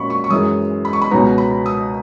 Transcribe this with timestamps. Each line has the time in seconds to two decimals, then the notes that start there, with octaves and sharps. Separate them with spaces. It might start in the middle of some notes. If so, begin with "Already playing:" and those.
Already playing: A#2 F#3 C#4 B5 C#6
0.10 C#6
0.24 C#6
0.30 F#2 E3 G#3 D#6
0.85 B5
0.93 C#6
1.02 B5
1.11 C#2 B2 F#3 B3 D#4 A#5
1.38 B5
1.66 D#6